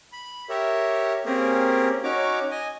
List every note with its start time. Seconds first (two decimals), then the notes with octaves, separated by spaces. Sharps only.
0.12 B5
0.49 G4 A#4 C#5 E5
1.25 A#3 C4 C#4 G4 G#4 A#4
2.04 C#4 D#4 F#4 C#5 A#5 D6
2.51 D#5 G#5